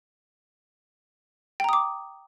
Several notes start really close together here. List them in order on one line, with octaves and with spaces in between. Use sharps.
G5 A#5 D#6 D6